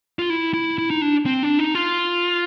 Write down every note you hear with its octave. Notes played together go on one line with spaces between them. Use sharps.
F4
E4
E4
E4
D#4
D4
C4
D4
D#4
F4